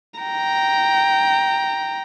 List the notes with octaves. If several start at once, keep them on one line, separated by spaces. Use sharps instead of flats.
G5 A#5